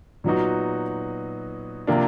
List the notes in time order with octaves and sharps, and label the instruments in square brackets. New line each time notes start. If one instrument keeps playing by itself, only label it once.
[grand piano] A#2 F#3 B3 D#4 F#4
C3 F3 A#3 D4